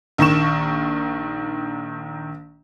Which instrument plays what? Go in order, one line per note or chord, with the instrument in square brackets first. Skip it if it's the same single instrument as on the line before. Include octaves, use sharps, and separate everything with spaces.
[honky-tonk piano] A#1 D#3 C#6 E7